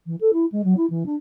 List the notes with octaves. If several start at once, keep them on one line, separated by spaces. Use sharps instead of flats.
E3
A4
E4
G#3
F#3
E4
E3
D4